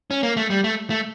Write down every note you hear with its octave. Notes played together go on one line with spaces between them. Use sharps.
C#4
A#3
A3
G3
A3
A3